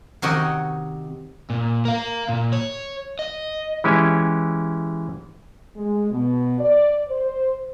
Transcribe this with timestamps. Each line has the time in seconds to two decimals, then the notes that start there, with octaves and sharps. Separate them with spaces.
0.22 C3 D#3 F#4 C#5 D#5
1.50 A#2
1.85 A#4 F5
2.29 A#2
2.52 C#5
3.19 D#5
3.84 E3 G#3 C#4 E4 G4 G#5
5.77 G#3
6.11 B2
6.58 D5
7.08 C5